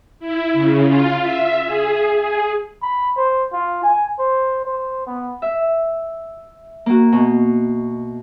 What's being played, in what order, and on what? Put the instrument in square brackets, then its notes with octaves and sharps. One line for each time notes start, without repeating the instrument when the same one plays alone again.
[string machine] E4
C#3
F4
E5
G#4
G#4
[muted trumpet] B5
C5
F4
G#5
C5
C5
B3
[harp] E5
A#3 F#4
B2